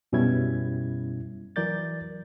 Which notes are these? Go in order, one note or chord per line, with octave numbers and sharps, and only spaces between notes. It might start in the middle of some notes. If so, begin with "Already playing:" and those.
F#2 B2 G3 C#4 E4 G#6
E3 F#3 A#4 D5 G6 A6